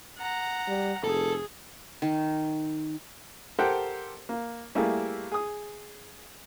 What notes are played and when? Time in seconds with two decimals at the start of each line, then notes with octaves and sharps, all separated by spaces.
0.18 F#5 A#5
0.68 G3
1.04 F1 G#4 A4
2.02 D#3
3.59 G4 A4 A#4 C5 F#5 G5
4.29 A#3
4.75 G3 A3 A#3 E4 G#4
5.32 G#4 D#6